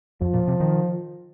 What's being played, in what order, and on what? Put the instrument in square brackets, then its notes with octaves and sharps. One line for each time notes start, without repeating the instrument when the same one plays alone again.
[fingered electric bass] F2 [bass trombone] F3
[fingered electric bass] A#2
C3
D#3